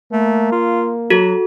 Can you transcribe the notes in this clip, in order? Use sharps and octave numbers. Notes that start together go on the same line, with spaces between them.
A3 A#3
F4
F#3 F#4 A4